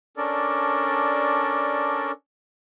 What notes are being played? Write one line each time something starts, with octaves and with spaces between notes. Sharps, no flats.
C#4 D4 A4 A#4 D5